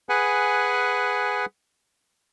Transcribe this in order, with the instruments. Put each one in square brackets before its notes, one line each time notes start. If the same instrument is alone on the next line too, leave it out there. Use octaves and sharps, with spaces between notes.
[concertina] G#4 B4 F#5 G#5